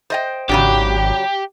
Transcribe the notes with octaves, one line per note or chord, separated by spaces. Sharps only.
C5 D#5 G5
G#1 C#3 F#3 D4 G4